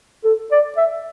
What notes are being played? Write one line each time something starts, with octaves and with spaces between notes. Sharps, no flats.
A4
D5
E5